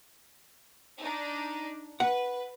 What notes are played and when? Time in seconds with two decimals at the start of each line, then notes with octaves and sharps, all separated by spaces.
0.99 D4 D#4
2.00 B4 F#5